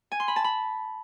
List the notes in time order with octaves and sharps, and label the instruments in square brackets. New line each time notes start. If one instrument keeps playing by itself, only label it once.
[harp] G#5
C6
B5
A5
B5